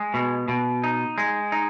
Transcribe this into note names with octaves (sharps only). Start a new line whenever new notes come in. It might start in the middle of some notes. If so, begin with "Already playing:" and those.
Already playing: G#3
B2
B2
D#4
G#3
D#4